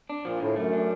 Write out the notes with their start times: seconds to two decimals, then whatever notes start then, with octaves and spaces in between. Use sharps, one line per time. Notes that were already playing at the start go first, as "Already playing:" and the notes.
0.10 D4
0.25 A#2 F3
0.40 A2 D3
0.56 F#2 A3
0.73 D4